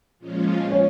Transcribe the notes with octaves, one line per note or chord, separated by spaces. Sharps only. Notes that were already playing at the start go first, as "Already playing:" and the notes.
A#2 F3 G#3 C#4 F4
C#4